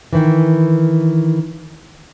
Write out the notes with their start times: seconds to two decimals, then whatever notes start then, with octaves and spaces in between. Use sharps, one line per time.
0.13 D#3 E3